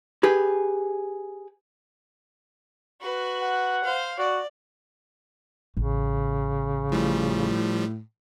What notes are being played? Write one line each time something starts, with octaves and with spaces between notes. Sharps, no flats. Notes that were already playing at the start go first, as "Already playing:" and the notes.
G4 G#4 B4
F#4 B4
F#5
C5 F5
F#4 D5
A1 C#3
A2 F3 G3